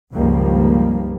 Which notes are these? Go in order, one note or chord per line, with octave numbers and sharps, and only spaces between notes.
C#2 G2 D#3 F3 G3 A#3